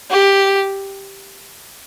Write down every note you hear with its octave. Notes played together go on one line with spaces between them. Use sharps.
G4